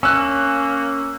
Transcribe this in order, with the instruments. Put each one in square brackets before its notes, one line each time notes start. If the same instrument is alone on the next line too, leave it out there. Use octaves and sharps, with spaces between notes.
[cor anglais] A#3 [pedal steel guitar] C#4 [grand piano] E6 F#6